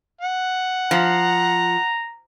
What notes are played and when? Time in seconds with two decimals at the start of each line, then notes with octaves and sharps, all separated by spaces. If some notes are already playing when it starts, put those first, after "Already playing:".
0.21 F#5
0.91 F3 A#5